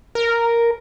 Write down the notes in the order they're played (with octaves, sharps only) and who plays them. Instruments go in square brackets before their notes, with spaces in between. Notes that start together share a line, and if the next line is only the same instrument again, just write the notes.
[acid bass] A#4